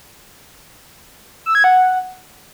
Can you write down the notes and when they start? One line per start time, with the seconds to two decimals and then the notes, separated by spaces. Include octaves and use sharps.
1.46 E6
1.55 G#6
1.64 F#5